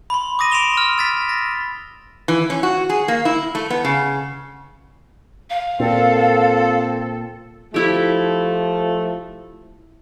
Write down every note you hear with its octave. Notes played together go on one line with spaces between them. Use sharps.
B5 C6
D6 D#6 A#6 D#7
C6 D7 E7 F7 G7
F6 A#6
E6 A6 B6
A#6
E3
C#4
F#4
G#4
A#3
E4
A3
B3
C#3
F5
A#2 C4 A4
F3 A3 E4 G4